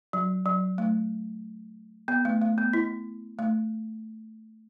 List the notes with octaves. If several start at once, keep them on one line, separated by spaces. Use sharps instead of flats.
F#3
F#3
A3
B3
A3
A3
B3
E4
A3